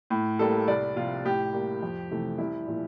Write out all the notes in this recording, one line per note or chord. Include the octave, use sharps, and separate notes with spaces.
A2
G3 A#3 A4
C2 D5
C3 F3 F4
A2 G4
G3 A#3
F2
C3 E3 A3
C2 E4
A#2 F3